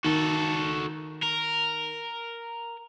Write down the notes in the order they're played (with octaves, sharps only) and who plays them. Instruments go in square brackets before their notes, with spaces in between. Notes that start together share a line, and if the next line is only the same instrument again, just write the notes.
[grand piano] D#3 [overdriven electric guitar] F#4 A4
[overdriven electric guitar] A#4